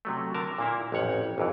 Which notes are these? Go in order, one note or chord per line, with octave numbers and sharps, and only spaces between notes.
C3 F#3 A3
D3 A#4 A5
A#2 A#3 E4
A1 F2 C#5 F#5
G#1 F2 E3